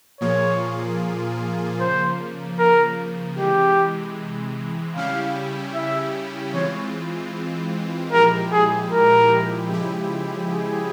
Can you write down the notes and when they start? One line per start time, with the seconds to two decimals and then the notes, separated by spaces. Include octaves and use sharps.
0.21 A#2 F3 A#3 F4 G#4 C#5
1.79 C#3 F3 A#3 C5
2.59 A#4
3.38 C3 E3 G#3 G4
4.95 C#3 G3 C#4 E4 G4 F5
5.75 E5
6.54 E3 G#3 C4 F4 C#5
8.12 A#2 F3 G#3 E4 G4 A#4
8.52 G#4
8.92 A#4
9.70 C#3 F3 G#3 E4 G4
10.50 G#4